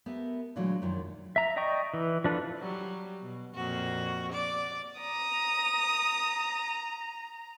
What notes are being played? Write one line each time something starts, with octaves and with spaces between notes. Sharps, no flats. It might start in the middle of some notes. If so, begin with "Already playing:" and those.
B3 G4 A4 A#4 E5
A#2 D3 E3 F#3 G#3 A3
F#2 A#2 D#3 F3
E5 A#5
D5 D#5 G5 A#5 C#6
E3
F3 D4 A4 B4 F5
F#3 G3
B2
F2 A#2 F#4
D5
A#5 D#6